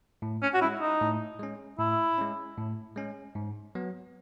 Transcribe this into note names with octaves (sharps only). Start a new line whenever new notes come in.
A2
C#4
F#4
G#3 C#4 E4
D#4
A2
G#3 C#4
A2 E4
G#3 C#4
A2
G#3 C#4
G#2
F#3 B3